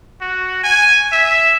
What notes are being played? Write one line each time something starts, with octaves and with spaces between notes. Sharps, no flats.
F#4
G#5
E5